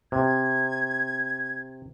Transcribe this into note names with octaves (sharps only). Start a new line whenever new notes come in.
C3 G#6